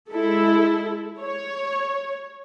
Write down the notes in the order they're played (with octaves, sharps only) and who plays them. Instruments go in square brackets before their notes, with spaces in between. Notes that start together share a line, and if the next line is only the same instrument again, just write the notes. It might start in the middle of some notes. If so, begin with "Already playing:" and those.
[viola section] G#3 E4 A4
C#5